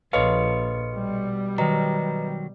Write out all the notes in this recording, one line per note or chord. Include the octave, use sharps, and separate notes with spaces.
A#1 A4 B4 C#5 D#5 F5 C6
B2 G3
D#3 F#3 B4 D#5 A#5